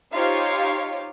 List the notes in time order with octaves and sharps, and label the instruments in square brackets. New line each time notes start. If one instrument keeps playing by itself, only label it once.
[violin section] D#4 F4 G4 C5 C#5 F5